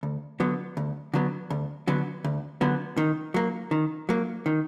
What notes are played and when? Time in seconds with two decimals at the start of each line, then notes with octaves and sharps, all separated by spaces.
0.03 D2
0.40 D3 F#3 B3
0.77 D2
1.14 D3 F#3 B3
1.50 D2
1.88 D3 F#3 B3
2.24 D2
2.61 D3 F#3 B3
2.97 D#3
3.34 F#3 A#3
3.71 D#3
4.09 F#3 A#3
4.46 D#3